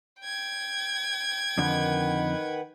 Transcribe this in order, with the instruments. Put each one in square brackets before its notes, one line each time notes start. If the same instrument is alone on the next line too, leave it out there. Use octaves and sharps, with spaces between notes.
[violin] G5 G#6
[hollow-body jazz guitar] F2 D3 [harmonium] D#3 B4 F#5